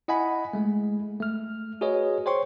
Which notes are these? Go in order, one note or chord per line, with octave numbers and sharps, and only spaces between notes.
E4 D#5 F#5 G#5 B5
G#3 A3
A3 F6
F#4 G#4 B4 C#5 D#5
C5 C#5 G5 C6 C#6